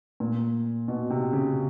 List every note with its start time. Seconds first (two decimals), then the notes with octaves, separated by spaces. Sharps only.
0.20 A#2
0.88 B2
1.10 C3
1.33 C#3